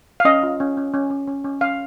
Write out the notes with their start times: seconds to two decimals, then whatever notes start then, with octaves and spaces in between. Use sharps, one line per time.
0.20 F5
0.25 C#4 D#5
0.43 F4
0.60 C#4
0.77 C#4
0.94 C#4
1.10 C#4
1.28 C#4
1.44 C#4
1.61 C#4 F5